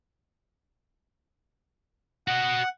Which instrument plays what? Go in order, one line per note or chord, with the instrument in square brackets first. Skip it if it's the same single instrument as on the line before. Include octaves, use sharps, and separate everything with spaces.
[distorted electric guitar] F#4 D#5 [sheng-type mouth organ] F#5